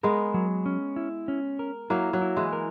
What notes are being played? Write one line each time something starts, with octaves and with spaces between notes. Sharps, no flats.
G#3 B3 A#4
F#3
C#4
E4
C#4
A#4
F#3 A#3 E4
F#3
E4
E3 G#3
A#4